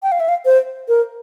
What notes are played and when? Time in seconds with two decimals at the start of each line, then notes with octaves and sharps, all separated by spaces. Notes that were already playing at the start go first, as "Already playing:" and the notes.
0.03 G5
0.12 F5
0.20 E5
0.29 F5
0.45 C5
0.88 A#4